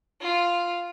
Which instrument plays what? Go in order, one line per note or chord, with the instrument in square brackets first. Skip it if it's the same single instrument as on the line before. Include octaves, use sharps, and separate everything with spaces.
[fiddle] F4